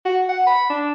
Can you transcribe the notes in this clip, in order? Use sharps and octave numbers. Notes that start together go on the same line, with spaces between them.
F#4
F#5
B5
D4